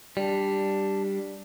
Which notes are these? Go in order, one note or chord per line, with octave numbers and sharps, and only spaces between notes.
G3 D4